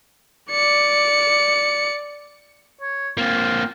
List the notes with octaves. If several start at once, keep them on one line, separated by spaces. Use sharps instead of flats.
D5 C#7
C#5
A#3 C4 F4